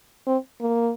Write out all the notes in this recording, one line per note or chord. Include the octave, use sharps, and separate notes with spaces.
C4
A#3